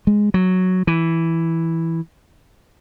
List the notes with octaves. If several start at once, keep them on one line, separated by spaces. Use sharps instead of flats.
G#3
F#3
E3